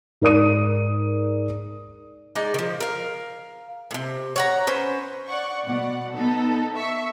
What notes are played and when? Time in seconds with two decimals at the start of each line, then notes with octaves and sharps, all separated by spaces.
0.21 G#2 A#4 D5 D#6 D#7
2.35 G#3 D#4 D5
2.54 D#3 F3
2.80 A#4 F5
3.91 A2 C3
4.36 C#5 F#5 A#5
4.67 C#4 B4 C5
5.28 D5 F#5 C#6
5.65 B2 D5 F#5
6.15 B3 D#4 A4
6.76 E5 C#6